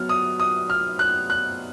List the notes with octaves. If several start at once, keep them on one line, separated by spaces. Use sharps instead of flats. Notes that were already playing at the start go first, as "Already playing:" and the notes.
Already playing: F#3 B3 F6
D#6
D#6
F6
F#6
F#6